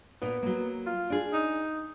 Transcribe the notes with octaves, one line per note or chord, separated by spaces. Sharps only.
A#2 A#3 B3
F#3 A#3
F4
D4 G#4
D#4